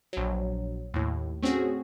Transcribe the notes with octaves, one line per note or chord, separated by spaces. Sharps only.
A#1 F#3
D#2 A2
A3 C4 C#4 F#4 G#4